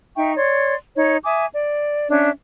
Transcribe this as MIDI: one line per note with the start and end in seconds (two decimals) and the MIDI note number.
0.16 0.34 63
0.16 0.34 76
0.16 0.34 79
0.16 0.34 85
0.36 0.75 73
0.36 0.75 74
0.36 0.75 84
0.96 1.17 63
0.96 1.17 73
1.24 1.45 76
1.24 1.45 80
1.24 1.45 86
1.24 1.45 87
1.52 2.08 74
2.10 2.29 61
2.10 2.29 62
2.10 2.29 76